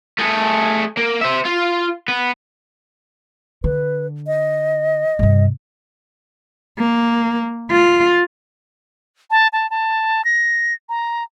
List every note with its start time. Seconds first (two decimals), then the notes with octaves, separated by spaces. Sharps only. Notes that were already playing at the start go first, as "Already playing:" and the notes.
0.19 A3 G#4
0.97 A#3
1.21 C5 E5
1.45 F4
2.08 B3
3.64 D3 B4
4.27 D#5
5.19 G2 C3
6.78 A#3
7.71 F4
9.31 A5
9.53 A5
9.70 A5
10.25 A#6
10.89 A#5